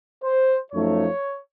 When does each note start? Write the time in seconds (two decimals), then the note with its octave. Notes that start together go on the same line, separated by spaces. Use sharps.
0.23 C5
0.72 F#2 F3 A3 D#4 C#5